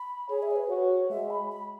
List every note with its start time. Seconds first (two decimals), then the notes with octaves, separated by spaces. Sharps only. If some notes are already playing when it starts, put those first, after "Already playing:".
Already playing: B5
0.29 G#4 C#5
0.43 E5
0.51 C#5
0.56 B4
0.69 F#4 C#5
1.10 G#3 E5
1.30 B5
1.50 B5